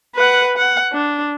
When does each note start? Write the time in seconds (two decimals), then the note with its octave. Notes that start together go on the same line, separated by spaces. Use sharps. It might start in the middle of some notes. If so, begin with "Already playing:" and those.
0.15 B4 F#5
0.57 F#5
0.92 D4